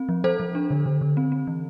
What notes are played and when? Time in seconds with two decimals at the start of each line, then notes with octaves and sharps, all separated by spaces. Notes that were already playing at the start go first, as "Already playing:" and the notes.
Already playing: C4
0.09 F3
0.24 F3 A4 C5
0.40 F3
0.55 D4
0.70 D3
0.86 D3
1.01 D3
1.17 C4
1.32 C4
1.47 E3